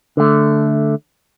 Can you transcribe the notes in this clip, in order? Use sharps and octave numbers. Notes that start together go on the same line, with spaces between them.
D3 A3